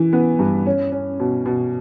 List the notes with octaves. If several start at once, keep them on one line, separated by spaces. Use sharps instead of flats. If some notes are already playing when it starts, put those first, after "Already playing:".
Already playing: E3
B3
G2
C#4
C#4
B2
B2